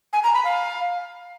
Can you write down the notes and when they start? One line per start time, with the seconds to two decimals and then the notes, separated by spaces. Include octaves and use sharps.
0.13 G#5
0.23 A#5
0.34 B5
0.44 F5